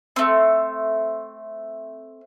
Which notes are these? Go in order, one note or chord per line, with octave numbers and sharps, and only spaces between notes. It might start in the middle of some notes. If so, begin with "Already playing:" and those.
A3 C4